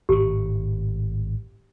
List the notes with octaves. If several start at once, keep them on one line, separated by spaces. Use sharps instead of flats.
G#1 A2 G4